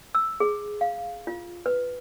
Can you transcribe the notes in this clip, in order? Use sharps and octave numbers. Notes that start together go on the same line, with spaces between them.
E6
G#4
F5
F4
B4